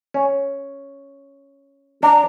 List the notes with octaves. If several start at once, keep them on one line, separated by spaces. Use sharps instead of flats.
C#4
D4 A#5